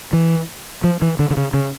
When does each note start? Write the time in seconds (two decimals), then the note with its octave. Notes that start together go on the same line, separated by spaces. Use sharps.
0.13 E3
0.84 F3
1.02 E3
1.19 D3
1.31 D3
1.37 C#3
1.54 C#3